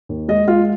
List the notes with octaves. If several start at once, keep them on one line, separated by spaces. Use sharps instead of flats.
D#2
G#3 D#5
G#3 F4